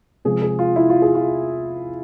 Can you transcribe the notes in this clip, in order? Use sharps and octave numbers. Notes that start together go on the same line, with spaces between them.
C3 F3 G#3 G#4
G#4
F4
E4
F4
G#4
F4